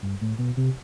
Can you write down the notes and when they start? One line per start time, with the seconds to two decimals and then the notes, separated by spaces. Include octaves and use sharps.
0.02 G2
0.21 A2
0.38 B2
0.57 C3